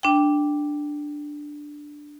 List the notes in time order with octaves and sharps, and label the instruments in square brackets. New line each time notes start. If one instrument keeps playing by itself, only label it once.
[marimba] D4 G5